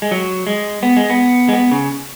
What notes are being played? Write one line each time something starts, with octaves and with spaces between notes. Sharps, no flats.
G#3
F#3
G#3
B3
G#3
B3
G#3
B3
C#3